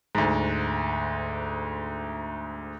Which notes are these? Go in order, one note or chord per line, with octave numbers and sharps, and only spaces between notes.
D2 G#2